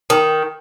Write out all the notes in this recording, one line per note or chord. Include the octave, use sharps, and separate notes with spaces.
D#3